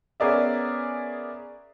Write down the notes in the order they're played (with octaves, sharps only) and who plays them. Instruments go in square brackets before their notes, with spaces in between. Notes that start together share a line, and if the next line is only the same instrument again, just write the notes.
[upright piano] B3 C#4 G#4 A#4 D5 E5